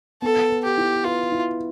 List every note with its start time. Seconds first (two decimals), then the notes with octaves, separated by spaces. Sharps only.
0.22 B3 A4
0.50 B4
0.64 G4
0.78 E4
1.04 F4 B4
1.32 E4